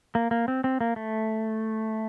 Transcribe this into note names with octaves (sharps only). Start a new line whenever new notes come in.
A#3
A#3
C4
C4
A#3
A3